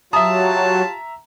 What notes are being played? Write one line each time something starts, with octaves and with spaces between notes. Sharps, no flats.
F#3 F4 G4 E5 A5 A#5 D#6